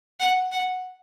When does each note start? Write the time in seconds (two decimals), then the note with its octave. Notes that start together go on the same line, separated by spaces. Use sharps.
0.20 F#5
0.51 F#5